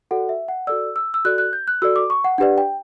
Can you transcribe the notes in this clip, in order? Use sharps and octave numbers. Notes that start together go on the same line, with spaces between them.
F#4 A4 D5 F#5
E5
F#5
F#4 A4 D5 E6
E6
E6
F#4 A4 D5 F#6
F#6
G6
F#6
F#4 A4 D5 E6
D6
C#6
F#5
D4 G4 B4 D5 F#5
G5